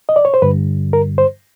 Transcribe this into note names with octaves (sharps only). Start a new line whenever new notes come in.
D#5
D5
C#5
C5
G2 D3 G3 B4
A#4
C5